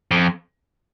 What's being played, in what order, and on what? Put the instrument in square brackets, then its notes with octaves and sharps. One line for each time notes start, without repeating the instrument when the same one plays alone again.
[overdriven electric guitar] F2